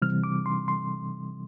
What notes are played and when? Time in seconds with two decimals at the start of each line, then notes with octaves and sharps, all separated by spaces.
0.02 C3 E3 G3 C4 F6
0.24 D6
0.46 C6
0.68 C6